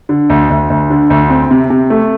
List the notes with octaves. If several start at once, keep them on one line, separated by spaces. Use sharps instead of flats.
D3
D2
D2
D2
D3
D2
C4
C3
C3
A3